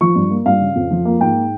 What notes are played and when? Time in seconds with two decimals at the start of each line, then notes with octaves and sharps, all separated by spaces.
0.01 F3 C#6
0.16 G2
0.31 A#3
0.46 G2 F5
0.61 C#3
0.76 F2
0.91 F3
1.05 A#3
1.21 G#2 G5